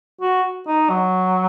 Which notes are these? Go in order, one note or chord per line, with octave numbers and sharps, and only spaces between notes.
F#4
D#4
F#3